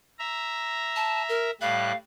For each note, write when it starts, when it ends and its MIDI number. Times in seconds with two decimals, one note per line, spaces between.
0.19 1.51 76
0.19 1.51 82
0.96 1.22 81
1.29 1.51 70
1.61 1.92 45
1.61 1.92 55
1.61 1.96 77
1.61 1.92 90